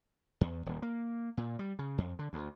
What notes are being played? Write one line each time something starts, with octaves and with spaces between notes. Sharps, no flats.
E2
D#1
A#3
A#2
G3
C#3
F2
D3
D2